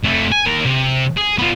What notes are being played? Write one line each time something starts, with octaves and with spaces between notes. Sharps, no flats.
F2 A3
G#5
D#2 A#4
C3
G#4
B3 F4